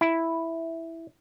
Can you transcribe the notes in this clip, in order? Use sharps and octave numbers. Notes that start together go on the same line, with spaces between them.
E4